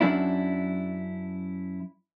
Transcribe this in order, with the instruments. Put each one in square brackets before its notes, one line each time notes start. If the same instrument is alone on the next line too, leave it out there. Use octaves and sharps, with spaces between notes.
[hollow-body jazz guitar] F#2 D4 E4